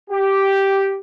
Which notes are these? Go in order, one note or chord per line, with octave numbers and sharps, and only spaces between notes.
G4